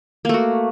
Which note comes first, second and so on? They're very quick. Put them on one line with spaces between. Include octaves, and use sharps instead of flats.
A#3 A3 F#4